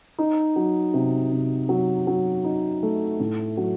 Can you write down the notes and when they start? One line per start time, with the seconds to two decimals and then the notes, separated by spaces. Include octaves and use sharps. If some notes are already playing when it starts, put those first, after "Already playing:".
0.19 D#4
0.56 F#3
0.94 C3
1.32 C3
1.69 F#3
2.07 F#3
2.44 D#4
2.83 A3
3.20 A2
3.57 F#3